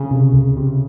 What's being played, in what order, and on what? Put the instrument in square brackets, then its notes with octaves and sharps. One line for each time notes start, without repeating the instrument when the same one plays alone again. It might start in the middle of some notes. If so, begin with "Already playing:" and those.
Already playing: [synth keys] C#3
[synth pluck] C3
C#2
C3